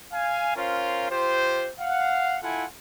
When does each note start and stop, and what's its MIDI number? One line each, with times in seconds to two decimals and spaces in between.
0.13 0.56 77
0.13 0.56 80
0.56 1.10 61
0.56 1.10 65
0.56 1.10 70
0.56 1.10 72
0.56 1.10 77
1.11 1.70 65
1.11 1.70 67
1.11 1.70 72
1.80 2.37 77
1.80 2.37 78
2.43 2.66 64
2.43 2.66 65
2.43 2.66 69
2.43 2.66 78
2.43 2.66 80